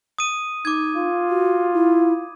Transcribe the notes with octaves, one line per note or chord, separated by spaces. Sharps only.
D#6 D#7
D#4 D6 G#6
F4
F#4
E4